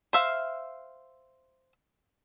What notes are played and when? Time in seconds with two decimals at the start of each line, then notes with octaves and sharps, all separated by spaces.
0.13 C5 E5 F5